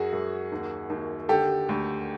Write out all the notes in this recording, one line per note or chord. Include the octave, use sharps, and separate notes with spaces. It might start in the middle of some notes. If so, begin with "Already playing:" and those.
Already playing: F#2 F#4 G#4
F#2
D#2
D#2
D3 G4 A4
D2